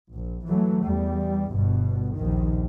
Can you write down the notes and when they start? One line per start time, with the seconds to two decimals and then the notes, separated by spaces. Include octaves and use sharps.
0.13 A#1
0.46 E3 F#3 A3
0.85 E2 G3
1.52 G1 G2 B2
2.15 A#1 D#2 D#3